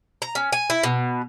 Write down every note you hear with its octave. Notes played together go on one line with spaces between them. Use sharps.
A#5
C#4
G#5
E4
B2